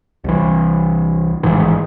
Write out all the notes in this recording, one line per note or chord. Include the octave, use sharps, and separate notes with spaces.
C2 E3
A1 G#2 D#3 E3